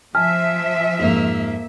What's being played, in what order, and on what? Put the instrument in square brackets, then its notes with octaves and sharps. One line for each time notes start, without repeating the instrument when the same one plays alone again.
[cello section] F3 E5 [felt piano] G#5 A5 [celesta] F6
[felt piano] F2 G#2 [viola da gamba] A#3